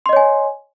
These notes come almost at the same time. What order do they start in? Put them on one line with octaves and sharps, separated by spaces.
C6 D#5 C#5 G#5